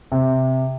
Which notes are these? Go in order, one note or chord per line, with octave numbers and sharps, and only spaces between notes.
C3